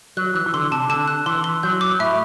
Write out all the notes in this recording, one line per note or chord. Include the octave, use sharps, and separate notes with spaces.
F#3 F#6
E3 F#6
E3
D3 C6
C3 A5
D3 A5
F#6
E3 C6
C6
F#3 G6
D6
A2 E5